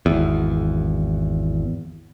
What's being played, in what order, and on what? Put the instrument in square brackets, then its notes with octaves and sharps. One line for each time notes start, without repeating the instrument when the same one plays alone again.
[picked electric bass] G#1 E2